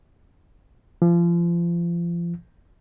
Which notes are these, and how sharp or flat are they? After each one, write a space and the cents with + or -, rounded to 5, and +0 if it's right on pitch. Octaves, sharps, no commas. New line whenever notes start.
F3 -30